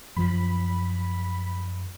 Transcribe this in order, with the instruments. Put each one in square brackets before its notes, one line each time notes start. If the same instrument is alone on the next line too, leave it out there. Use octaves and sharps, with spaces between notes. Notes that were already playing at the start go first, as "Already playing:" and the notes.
[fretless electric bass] F#2 F3 [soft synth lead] B5